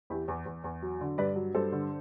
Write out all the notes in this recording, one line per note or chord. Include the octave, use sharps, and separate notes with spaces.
E2 E4 G4
E2
E2
E2
F#3
D3
G2 B4 D5
F#3
G2 A4 C5
D3